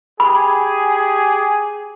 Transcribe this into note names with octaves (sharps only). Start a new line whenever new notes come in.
G4 G#4 B5